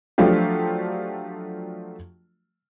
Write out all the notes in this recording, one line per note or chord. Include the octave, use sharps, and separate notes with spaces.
F3 F#3 A3 D4 F4 G4